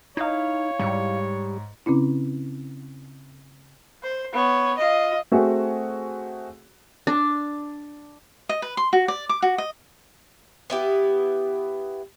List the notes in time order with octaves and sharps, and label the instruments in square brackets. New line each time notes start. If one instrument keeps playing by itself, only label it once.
[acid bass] D#4 [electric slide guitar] E4 F5 [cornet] C#5
[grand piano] G#2 C#7 [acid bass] G3
[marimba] C#3 C4 C#4 E4
[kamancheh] C5
B3 C#5
F4 D#5
[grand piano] A3 C4 F#4 G#4
[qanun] D4
[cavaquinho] D#5
B4
C6
F#4
D5
D6
F#4
D#5
[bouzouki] B3 E4 G4